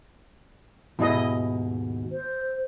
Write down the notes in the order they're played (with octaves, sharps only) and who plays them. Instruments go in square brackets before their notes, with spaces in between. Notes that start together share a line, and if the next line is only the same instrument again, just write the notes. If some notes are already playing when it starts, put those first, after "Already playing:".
[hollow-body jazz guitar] D#2 G#2 B2 [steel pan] E4 D#5
[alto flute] C5